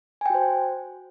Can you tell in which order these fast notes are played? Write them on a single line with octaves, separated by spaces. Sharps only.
G#5 G5 F#4 C5